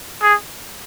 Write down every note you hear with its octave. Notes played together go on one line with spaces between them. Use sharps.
G#4